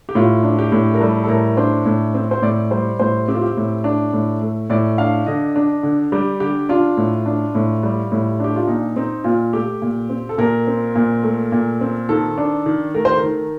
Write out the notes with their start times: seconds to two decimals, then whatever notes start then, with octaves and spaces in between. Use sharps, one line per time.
0.09 G4
0.15 A2 F4
0.43 D4
0.59 G4
0.72 A2
0.94 A#4
1.00 G3 A4
1.24 A4
1.28 A2 A#4
1.57 D4 C5
1.86 A2
2.14 C4
2.31 C5
2.42 A2 D5
2.71 G3 C5
3.00 A2 C5
3.28 C4 G4
3.35 F4
3.42 G4
3.57 A2
3.84 D4
4.13 A2
4.41 A3
4.70 A2 D5
4.98 D4 F5
5.26 D3 D#5
5.56 D4
5.83 D3
6.12 G3 G4
6.40 D3 G4
6.69 D4 F4
6.97 A2
7.26 D4
7.55 A2
7.83 G3
8.12 A2
8.40 D4 G4
8.56 F4
8.67 A#2 D#4
8.96 C4 D#4
9.24 A#2 F4
9.53 A3 G4
9.82 A#2
10.09 C4
10.29 A4
10.38 A#2 A#4
10.67 C4
10.96 A#2
11.23 A3
11.52 A#2
11.81 C4
12.09 D#3 A4
12.38 D4
12.66 D#3
12.94 A3 A#4
13.05 C5
13.16 A#4
13.23 D#3